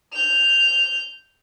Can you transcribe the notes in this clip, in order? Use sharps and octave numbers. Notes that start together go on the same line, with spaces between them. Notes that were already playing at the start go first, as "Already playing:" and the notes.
G6 F7